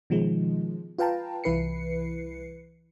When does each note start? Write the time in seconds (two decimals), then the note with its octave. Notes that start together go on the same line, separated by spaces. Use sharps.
0.10 B2 D#3 F3 G#3
0.98 F4 B4 F5 G5 A5 A#5
1.44 C2 E3 E4 B4 C7 C#7